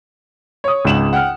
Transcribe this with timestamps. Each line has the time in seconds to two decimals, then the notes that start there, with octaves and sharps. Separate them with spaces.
0.64 C#5 D#6
0.85 G#1 C#2 E7 F#7
1.13 F#5 G5 F6